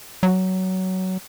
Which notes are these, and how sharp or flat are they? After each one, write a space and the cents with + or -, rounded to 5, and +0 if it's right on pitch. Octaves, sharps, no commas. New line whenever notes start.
F#3 +15